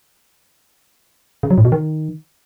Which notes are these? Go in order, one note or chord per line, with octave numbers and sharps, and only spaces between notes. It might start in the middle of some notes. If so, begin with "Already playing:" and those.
C#3
F#3
A2
B2
D#3